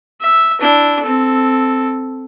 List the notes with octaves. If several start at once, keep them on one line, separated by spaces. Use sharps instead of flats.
E5
D4 E4
C4 A4